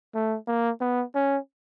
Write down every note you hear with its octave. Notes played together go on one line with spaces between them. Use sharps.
A3
A#3
B3
C#4